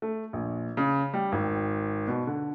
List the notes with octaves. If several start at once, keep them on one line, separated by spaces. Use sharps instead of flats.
A3
A#1
C#3
G3
G#1
B2
D3